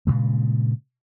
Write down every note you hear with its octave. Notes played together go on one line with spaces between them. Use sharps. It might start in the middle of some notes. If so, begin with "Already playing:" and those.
G2 A#2 C#3 G#3